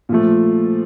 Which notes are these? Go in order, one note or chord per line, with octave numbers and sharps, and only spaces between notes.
A#2 F3 A3